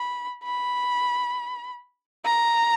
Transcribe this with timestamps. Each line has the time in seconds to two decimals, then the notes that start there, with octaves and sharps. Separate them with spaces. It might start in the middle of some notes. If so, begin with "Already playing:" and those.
Already playing: B5
0.44 B5
2.25 A#5